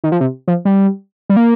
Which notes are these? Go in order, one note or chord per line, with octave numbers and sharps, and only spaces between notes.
D#3
F3
C3
F3
G3
G3
A#3